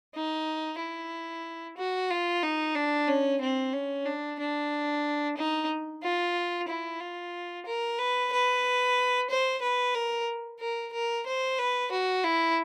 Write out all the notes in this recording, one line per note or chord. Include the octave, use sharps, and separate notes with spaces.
D#4
E4
F#4
F4
D#4
D4
C#4
C4
C#4
D4
D4
D#4
F4
E4
F4
A#4
B4
B4
C5
B4
A#4
A#4
A#4
C5
B4
F#4
E4